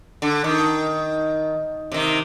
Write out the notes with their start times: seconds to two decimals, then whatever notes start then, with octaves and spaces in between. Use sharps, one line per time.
0.22 D3
0.44 D#3
1.92 C3 D#3